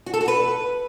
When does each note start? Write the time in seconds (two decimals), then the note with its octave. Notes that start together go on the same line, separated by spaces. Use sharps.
0.06 F#4
0.14 A4
0.21 F#4
0.28 B4